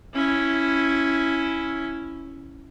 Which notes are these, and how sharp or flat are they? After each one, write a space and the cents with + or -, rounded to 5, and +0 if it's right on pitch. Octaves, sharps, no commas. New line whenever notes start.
C#4 +0 E4 +0